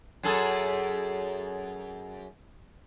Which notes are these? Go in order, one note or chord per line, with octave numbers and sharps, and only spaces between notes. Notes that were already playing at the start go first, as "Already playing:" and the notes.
F#2 G#4 A4